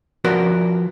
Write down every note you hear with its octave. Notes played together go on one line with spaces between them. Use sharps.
F3 F#4 A#4 B4 D5